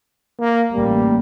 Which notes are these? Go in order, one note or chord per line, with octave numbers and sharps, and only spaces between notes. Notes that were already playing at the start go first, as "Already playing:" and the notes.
A#3
A1 G3 A#3